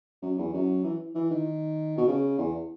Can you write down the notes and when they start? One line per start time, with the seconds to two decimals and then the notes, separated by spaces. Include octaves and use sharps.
0.22 F#2
0.38 E2
0.53 F#2
0.84 E3
1.15 E3
1.31 D#3
1.98 B2
2.08 C#3
2.38 E2